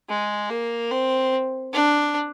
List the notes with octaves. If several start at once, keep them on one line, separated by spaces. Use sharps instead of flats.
G#3
A#3
C4
D4